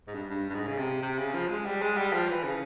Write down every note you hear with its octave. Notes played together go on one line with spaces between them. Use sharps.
G#2
G2
G2
G2
G#2
C#3
C3
C3
C#3
F3
G#3
G3
G#3
G3
F3
E3
C#3